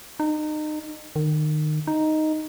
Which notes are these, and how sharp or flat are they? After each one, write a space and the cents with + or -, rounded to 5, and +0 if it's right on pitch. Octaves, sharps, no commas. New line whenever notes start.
D#4 -30
D#3 -30
D#4 +0